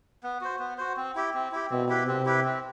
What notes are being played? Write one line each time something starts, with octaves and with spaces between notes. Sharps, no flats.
B3
F#4 C5
B3
F#4 C5
C4
E4 G4
C4
E4 G4
B2 C4
E4 G4 B4
C3 C4
E4 G4 B4
C4